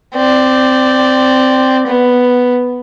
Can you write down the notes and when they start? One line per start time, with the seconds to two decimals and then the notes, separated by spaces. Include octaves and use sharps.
0.15 C4 D5
1.87 B3